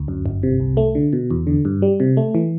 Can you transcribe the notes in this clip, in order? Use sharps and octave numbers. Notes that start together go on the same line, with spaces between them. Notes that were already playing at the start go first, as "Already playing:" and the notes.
Already playing: D2
F#2
G1
C3
C2
A3
D3
B2
E2
D3
G2
G3
C3
A3
E3